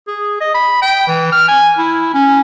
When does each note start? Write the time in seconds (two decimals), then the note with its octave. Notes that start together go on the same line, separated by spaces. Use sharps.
0.07 G#4
0.41 D#5
0.55 B5
0.82 G5
1.08 E3
1.32 F6
1.48 G#5
1.78 E4
2.14 C#4